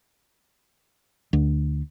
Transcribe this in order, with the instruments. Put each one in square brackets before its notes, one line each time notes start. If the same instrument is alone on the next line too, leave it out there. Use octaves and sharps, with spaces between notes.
[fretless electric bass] D2